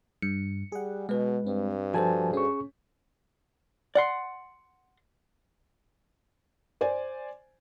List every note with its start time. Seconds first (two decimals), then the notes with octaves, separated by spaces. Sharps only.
0.22 G2 C#7
0.72 G3 G#4 F#5
1.09 B2 G#3 B4
1.47 G2 C4
1.94 F3 F#4 A4 C5 G#5 A5
2.33 C#4 G#4 C#6
3.95 D5 F#5 C6
6.81 C5 D5 G#5